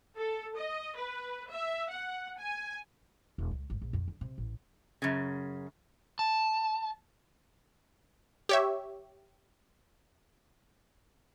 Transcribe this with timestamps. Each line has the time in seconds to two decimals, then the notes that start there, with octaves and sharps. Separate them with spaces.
0.16 A4
0.56 D#5
0.96 B4
1.49 E5
1.89 F#5
2.38 G#5
3.38 E1
3.51 C#2
3.70 G#1
3.81 A#1
3.93 F2
4.08 D3
4.21 C3
4.38 A1
5.02 F#2 C#3
6.19 A5
8.49 G4 C#5 E5